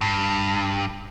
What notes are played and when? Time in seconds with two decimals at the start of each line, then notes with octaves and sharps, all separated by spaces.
0.01 G2